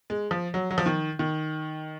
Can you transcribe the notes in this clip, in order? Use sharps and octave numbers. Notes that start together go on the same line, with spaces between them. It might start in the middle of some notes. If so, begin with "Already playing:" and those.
G#3
F3
F#3
F#3
F3
D#3
D#3